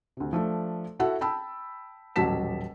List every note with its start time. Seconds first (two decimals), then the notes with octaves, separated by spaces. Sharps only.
0.17 D2 C3
0.33 F3 A3 D4
0.99 E4 F#4 A4 F#5
1.21 G5 A5 B5 E6
2.16 D#1 A1 F#3 A5 B6 E7